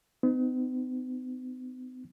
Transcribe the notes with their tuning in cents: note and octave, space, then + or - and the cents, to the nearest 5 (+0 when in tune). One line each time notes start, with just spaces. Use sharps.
B3 +45 D#4 -20